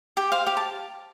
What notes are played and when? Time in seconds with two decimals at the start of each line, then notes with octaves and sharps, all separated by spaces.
0.17 G4 G5
0.32 C5 F5
0.46 G4 F5
0.57 A5